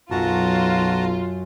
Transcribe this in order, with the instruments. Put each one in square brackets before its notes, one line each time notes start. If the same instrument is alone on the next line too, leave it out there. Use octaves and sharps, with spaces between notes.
[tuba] B1 [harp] F#2 [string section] F4 [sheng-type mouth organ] F#4 A5 A#5